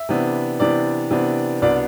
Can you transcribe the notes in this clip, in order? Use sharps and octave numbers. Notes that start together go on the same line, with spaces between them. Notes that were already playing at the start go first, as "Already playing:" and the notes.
Already playing: E5
C3 E3 B3 D4
C3 E3 B3 D4 D5
C3 E3 B3 D4
C2 B2 B3 D4 D5